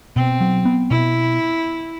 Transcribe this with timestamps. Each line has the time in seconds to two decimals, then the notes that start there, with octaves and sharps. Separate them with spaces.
0.16 B2 C4
0.41 F#3
0.65 B3
0.90 B2 E4